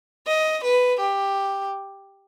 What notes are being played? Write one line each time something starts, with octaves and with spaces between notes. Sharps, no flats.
D#5
B4
G4